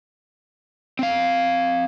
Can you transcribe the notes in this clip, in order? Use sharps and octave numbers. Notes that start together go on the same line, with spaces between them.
C4 F5